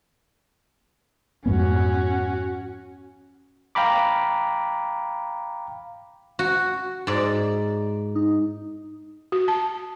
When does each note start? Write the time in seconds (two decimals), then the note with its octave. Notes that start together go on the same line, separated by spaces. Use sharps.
1.46 F2 G#2 B3 C#4 F#4
3.75 F5 G5 A#5 B5 D6
6.39 F#4
7.07 G#2 D5
8.15 D#4
9.32 F#4
9.48 A5